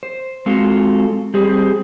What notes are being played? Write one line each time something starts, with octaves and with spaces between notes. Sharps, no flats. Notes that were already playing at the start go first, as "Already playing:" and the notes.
C5
G#3 C4 F4 F#4 A4
G3 C4 G4 G#4 C5